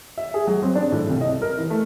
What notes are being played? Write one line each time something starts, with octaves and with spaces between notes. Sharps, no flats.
E5
G#4
F#3
C4
D4
A2
C2
D#5
A#4
E3
A3